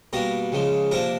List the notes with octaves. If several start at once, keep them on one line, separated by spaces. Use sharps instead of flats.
B2 G3 A#3 D4 A#4 A#5
C#2 C#3 F3 G#3
C3 F3 A#3 D4 A#4 A#5